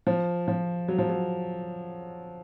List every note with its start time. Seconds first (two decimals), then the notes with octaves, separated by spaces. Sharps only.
0.07 F3
0.48 F3
0.88 F#3
0.98 F3
1.10 F#3